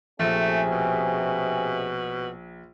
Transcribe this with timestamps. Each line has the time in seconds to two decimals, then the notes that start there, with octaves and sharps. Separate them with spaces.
0.20 A#1 C3 A3 C#4 G#4
0.70 B2